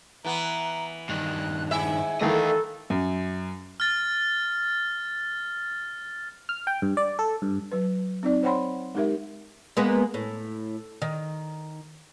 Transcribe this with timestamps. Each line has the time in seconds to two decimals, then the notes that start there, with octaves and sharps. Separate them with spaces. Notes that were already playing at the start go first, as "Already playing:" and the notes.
0.25 E3 B3 A#5
1.09 G2 D#3 F#6
1.71 G#2 E4 E5 G#5
2.21 D#3 E3 A3 A4 D#5 F5
2.90 F#2
3.80 F6 A6
6.49 F6
6.67 G5
6.82 G2
6.97 D5
7.19 A4
7.42 G2
7.72 F#3 B4
8.23 C4 D#4 D5
8.43 C5 C#5 F#5 G5 B5 C6
8.95 G#3 D#4 G4 A#4 E5
9.77 G#3 A#3 B3
10.14 A2
11.02 D#3